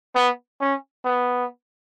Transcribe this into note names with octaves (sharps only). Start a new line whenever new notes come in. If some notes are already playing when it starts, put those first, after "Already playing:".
B3
C#4
B3